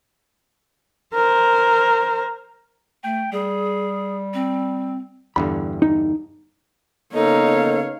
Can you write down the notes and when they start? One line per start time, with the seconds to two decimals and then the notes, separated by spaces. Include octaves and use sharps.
1.14 A#4 C5
3.04 A3 G5
3.32 G3 G#4
4.34 C4
5.36 E2 G2 D3 B5
5.82 D#4
7.14 C#3 A#3 B3 D#4 A4 C#5 F5